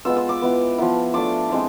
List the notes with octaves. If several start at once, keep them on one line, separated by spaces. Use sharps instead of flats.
G#3 B3 F4 E6
E6
D6
B3 E4
F3 B3 E4
A3 D4 F4 D6
G#3 C4 E4